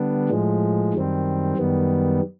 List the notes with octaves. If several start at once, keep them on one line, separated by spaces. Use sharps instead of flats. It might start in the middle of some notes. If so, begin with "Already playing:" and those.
Already playing: D3 G3 B3 D4
A2 F3 G#3
F#2 D#3 G3 C4
F#2 D#3 G3 B3